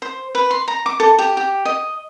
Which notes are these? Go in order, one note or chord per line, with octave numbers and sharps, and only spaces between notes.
C5
B4
C6
A#5
D6
A4
G4
G4
D#5